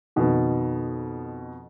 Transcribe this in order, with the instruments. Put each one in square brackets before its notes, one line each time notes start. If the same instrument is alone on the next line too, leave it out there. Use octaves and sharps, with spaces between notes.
[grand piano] F2 B2 D#3